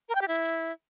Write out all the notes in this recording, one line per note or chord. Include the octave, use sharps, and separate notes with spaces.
A#4
G5
G4
E4